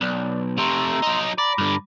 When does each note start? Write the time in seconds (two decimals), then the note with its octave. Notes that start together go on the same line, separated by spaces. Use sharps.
0.01 B1 D5
0.58 C3 A3 A#5 C6 E6
1.02 F#3 D#4
1.38 D5 A#5 B5 D6
1.58 G2 D3